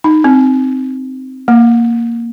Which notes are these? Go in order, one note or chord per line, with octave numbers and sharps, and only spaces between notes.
D#4
C4
A#3